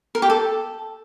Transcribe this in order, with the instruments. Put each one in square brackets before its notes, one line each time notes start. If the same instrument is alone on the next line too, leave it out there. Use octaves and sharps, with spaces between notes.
[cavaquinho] A#4
G4
A4